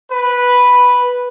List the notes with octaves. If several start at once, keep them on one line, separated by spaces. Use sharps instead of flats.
B4